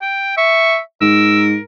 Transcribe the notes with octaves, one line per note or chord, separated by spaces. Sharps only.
G5
E5 C#6
G#2 A#4 E6